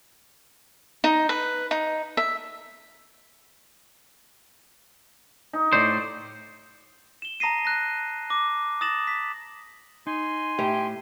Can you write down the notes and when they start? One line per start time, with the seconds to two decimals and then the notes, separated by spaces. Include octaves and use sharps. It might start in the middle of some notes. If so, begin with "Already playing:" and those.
1.04 D#4
1.29 B4
1.71 D#4
2.17 E5
5.53 D#4
5.73 A2 C5 D5
7.22 E7 G7
7.40 A5 A#5 D#6 A#6 C7 D#7
7.65 F#6 A#6
8.30 D6 A#6
8.81 D#6 A6 A#6 E7 F#7
9.07 B6
10.07 D#4 G#5 C6
10.59 A2 G4